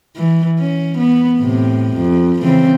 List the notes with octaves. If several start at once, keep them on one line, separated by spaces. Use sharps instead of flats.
E3
C#4
B3
A2 C3
F2
C#3 E3 C4